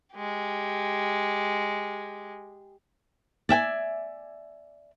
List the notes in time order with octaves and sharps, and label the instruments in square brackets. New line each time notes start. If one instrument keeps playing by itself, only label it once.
[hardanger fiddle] G#3 G4
[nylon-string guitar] D5 E5 G5 G#5